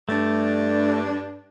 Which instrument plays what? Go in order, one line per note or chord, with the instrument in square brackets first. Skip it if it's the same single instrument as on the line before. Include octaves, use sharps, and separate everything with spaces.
[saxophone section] G2 D4 [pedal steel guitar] A3